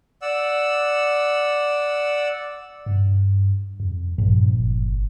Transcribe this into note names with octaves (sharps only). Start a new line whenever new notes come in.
D5 F#5 E6
G2
F2
A#1 G2
G1